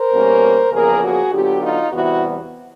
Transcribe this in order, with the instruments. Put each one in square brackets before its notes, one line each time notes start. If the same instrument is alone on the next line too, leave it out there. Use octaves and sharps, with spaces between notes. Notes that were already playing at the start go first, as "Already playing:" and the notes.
Already playing: [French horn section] A#4 C5
B2 G3 A#3 C#4
E2 C#3 F3 A#3 G#4 A#4
F#4 G#4
D3 F#3 B3 F4 G4
D#4 F4
E2 C3 E3 G3 B3 E4 F#4